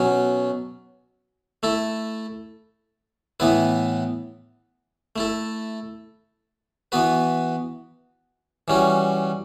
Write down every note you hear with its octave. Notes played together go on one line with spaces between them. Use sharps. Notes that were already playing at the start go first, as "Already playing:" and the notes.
Already playing: B2 F#3 C#4
A3 E4 A4
A2 E3 B3 E4 B4
A3 E4 A4
E3 B3 F#4 B4
E3 G3 C#4 F#4